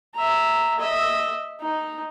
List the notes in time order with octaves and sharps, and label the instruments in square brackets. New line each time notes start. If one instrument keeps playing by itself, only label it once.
[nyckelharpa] E5 A#5
D#5 E5
D#4